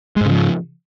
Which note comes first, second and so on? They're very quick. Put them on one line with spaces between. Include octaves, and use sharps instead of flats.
G#3 G#2 C#3 F3